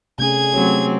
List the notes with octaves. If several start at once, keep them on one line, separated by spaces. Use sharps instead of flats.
C3 A3 C#4 G#4 G#6
F#3 A3 C4 C#4 G4 C#5